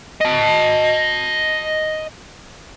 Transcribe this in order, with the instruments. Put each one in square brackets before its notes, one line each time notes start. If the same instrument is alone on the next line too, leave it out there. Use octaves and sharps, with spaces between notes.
[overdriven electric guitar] D#5 A5